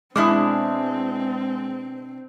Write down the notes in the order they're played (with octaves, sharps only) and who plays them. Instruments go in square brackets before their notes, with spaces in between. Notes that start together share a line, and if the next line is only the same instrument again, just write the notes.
[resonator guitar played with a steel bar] B2 D4 E4 [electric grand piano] G#3 [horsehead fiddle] C4 [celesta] D6 D#6